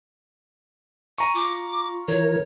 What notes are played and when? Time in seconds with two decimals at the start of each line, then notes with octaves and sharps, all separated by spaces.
1.18 G#5 A#5 C#6
1.35 F4 D6
2.08 E3 A#4 C#5